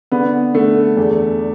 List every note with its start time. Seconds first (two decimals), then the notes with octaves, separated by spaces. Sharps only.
0.12 D3 B3
0.54 D3 A3
0.97 E2